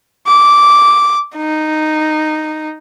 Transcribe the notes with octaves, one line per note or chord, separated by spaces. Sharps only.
D6
D#4